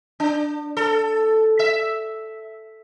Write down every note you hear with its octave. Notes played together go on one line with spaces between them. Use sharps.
D4
A4
E5